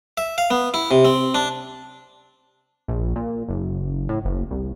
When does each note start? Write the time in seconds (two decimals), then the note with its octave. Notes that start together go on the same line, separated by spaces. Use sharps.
0.18 E5
0.38 F5
0.51 B3
0.74 E4
0.91 C3
1.05 C4
1.35 D4
2.88 A#1
3.16 A#2
3.49 F#1
4.09 A2
4.25 F#1
4.51 C2